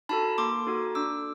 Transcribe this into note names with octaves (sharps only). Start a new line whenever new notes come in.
D#4 F#4 A4 A5 B5
A#3 C6 D6
D#4 F#4 A4
D4 D6 E6